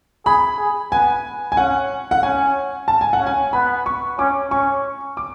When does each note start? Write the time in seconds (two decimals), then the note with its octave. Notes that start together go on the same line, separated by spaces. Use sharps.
0.26 G#4 B5
0.59 G#4
0.92 B3 G#5
1.52 G#5
1.56 C#4 F#5
2.11 F#5
2.23 C#4 G#5
2.88 A5
3.01 G#5
3.13 F#5
3.21 C#4
3.27 G#5
3.53 B3 B5
3.86 C#6
4.19 C#4 D6
4.51 C#4 C#6
5.17 D6